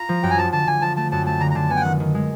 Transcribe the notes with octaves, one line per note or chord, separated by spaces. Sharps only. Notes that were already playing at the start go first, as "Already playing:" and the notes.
Already playing: F4 A#5
F3
F#2 G5
G#5
F3 A5
D3 A5
D3 G#5
F3 A5
A3 A5
F#2 A5
A3 A5
D3 A#5
A#5
D3 A5
B3 G#5
G5
D#3 F#5
D#3
G#3